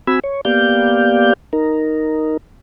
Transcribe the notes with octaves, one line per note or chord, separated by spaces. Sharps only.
C4 F#4 G#5 B5 E6
C#5
A#3 B3 G4 D5 F5 G6
D#4 A#4